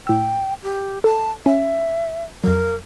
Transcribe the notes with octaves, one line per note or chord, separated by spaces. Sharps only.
A2 G5 E6
G4
A4 A5
C#4 E5
F2 F#3 A#4